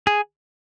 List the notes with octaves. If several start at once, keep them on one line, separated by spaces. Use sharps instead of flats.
G#4